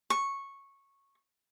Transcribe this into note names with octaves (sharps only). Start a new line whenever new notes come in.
C#6